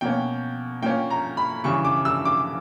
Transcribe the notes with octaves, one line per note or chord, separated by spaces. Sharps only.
B2 A#3 C#4 G5
A#2 A#3 C#4 G5
A#5
B5
C#3 E3 G3 C#6
D6
E6
D6